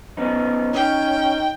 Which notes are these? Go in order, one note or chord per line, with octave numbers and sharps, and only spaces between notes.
B3 C#4 D#4
C#4 D#4 G5